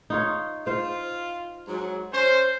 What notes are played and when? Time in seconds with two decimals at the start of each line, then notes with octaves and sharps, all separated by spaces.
0.10 D#4 F4 C#5
0.67 F4 C5 F5
1.68 G#2 F#3
2.13 C#4 C5